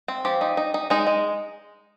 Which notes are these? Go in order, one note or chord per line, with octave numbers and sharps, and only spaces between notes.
C4
F3 G4
D#4
D#4
D#4
G#3 D#4
G#3